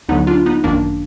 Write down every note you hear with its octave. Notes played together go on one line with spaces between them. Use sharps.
D2 D3 F#3 B3 D#4
D4 F4
B3 D#4
G#1 F#2 D#3 A#3 D4